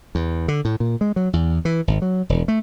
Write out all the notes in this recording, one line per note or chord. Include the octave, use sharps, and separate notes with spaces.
E2
D3
A2
A#2
G#3
F#3
E2
E3
G#1
F#3
E1
A3